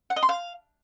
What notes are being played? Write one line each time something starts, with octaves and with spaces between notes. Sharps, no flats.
F#5
D#5
C6
F5